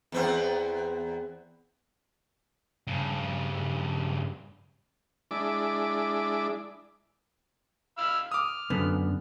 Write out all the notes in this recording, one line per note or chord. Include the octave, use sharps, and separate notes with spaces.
E2 B3 C4
G2 C#3
G#3 D4 E4 D6
F5 B5 E6
D6 D#6 F6
F#2 D3 B3